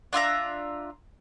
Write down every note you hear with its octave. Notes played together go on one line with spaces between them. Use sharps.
D4 F4 E5 A#5